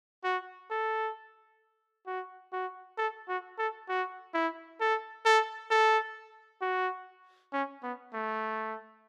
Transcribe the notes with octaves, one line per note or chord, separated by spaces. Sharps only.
F#4
A4
F#4
F#4
A4
F#4
A4
F#4
E4
A4
A4
A4
F#4
C#4
B3
A3